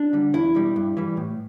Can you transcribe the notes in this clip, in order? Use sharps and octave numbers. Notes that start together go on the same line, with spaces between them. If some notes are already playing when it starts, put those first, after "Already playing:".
Already playing: D4
D3 G3
E2 E4
B2 G3
G2
E3 G3
A2